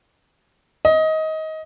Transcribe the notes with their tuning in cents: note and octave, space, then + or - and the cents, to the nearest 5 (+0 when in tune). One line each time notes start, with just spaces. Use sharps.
D#5 +20